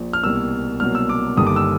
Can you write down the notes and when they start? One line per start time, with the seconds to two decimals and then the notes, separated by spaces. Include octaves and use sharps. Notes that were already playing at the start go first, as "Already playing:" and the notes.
Already playing: A#1 A#2
0.13 F6
0.23 C2 B2 G3 A#3 E6
0.80 C2 B2 F#3 A#3 F6
0.95 E6
1.09 D6
1.37 G1 G2 D#3 G3 A#3 D#6
1.47 D6
1.56 E6